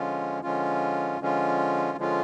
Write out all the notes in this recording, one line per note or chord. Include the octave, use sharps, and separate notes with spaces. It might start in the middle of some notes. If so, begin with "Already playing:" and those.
Already playing: D3 F3 G#3 C#4 F4
D3 F3 G#3 C#4 F4
D3 F3 G#3 C#4 F4
D3 F3 G#3 C#4 F4